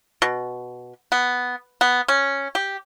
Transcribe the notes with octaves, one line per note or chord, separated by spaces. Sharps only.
B2
B3
B3
C#4
G4